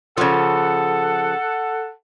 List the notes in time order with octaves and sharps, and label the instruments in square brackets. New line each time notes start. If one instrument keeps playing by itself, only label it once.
[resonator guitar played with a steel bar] C#3 F3 [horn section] A4 F#5